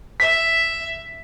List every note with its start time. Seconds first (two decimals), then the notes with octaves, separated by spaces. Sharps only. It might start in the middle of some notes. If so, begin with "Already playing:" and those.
0.20 E5 B6